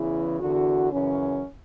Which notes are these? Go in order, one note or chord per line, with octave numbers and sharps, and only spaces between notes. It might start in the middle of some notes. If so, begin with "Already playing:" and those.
Already playing: E2 C#3 E3 E4
E2 D3 F#4
F#2 C#3 E3 C#4